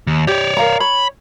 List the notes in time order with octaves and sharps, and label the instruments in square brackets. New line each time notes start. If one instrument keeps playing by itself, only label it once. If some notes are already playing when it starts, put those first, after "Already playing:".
[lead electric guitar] D#2
[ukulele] G4 [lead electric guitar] C#5 D5
[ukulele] A#4 F5 A#5
[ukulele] C#5 [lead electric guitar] B5